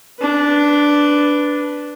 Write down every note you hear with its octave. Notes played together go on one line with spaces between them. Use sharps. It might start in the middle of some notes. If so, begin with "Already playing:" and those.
D4 B4